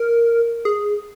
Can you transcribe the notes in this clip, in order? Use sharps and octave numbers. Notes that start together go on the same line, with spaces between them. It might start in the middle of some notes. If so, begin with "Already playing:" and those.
Already playing: A#4
G#4